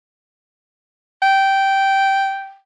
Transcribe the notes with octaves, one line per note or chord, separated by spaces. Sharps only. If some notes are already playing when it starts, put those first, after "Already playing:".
G5